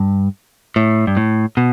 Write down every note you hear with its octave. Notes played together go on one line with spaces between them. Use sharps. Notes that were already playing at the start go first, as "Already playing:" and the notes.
Already playing: G2
A2
G2
A2
B2